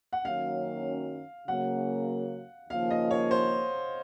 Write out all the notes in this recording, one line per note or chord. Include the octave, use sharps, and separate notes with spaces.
F#5
F#2 D#3 F#3 A#3 C#4 F5
C#3 F#3 A#3 F#5
D#2 C#3 F3 A#3 F5
D#5
C#5
C5